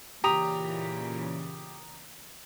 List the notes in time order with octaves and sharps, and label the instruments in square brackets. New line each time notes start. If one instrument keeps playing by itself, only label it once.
[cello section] A#2 C#3 E3 [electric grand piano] G4 [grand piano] A#5 D#6 F7